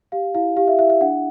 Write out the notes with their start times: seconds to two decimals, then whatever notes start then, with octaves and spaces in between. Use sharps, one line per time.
0.12 G4 F5
0.34 E4 F5
0.57 G4 F5
0.67 E5
0.79 E4 E5
0.90 E5
1.01 D4 F#5